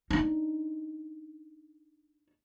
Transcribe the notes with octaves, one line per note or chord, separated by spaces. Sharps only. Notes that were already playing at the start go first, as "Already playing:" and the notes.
D4 D#4